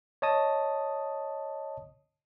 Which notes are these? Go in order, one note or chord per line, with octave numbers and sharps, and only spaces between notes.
C#5 D#5 A5 D#6